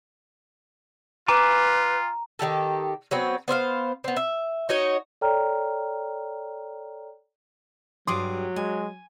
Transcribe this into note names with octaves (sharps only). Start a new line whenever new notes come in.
F4 B4 G#5 A#5 D6
D#3 G3 G4 A4
F#3 B3 C4
B3 C5 E5 F5
B3 C4
E5
D#4 F#4 C#5 D#5
A4 C#5 D5 G5 A#5 F6
G2 F#3 G3 G#4 C6 D6 D#6
G#3 G#5